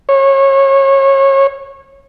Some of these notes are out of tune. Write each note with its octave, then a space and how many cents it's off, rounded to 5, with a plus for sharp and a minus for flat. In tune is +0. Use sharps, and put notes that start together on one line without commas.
C#5 -30